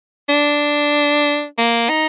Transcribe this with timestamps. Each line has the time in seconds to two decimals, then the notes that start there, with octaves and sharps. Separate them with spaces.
0.29 D4
1.58 A#3
1.89 D#4